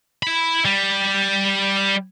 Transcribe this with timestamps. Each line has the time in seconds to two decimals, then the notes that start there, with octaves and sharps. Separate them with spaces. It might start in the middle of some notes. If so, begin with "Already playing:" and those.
0.23 E4 B5
0.65 G3